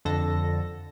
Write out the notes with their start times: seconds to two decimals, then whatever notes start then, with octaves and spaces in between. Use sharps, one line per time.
0.05 F2 D3 A4 A#6